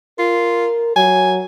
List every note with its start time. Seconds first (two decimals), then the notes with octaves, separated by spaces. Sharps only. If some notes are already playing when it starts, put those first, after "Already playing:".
0.19 F4 A#4
0.96 F#3 G#5